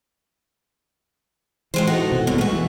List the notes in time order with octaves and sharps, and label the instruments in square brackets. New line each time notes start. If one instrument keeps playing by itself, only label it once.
[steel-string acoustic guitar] A2 G#3 C5 [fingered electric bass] E3
[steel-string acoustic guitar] D#4 F#4 A4
[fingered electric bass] B2
[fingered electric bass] C2 G3 B3 [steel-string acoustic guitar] F#2 B2
[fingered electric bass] G#3 [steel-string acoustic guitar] A3 F#4
[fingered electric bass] E3